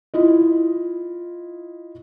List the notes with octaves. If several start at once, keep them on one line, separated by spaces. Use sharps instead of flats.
E4 F4 D#5